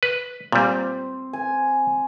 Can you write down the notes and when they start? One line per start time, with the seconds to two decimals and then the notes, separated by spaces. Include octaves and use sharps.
0.03 B4
0.52 A#2 G3 C4
1.33 G#5